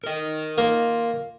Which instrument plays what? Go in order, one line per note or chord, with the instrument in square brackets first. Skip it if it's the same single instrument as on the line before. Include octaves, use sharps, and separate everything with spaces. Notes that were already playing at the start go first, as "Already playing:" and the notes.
[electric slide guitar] A#4 D#5
[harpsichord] A#3 [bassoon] F4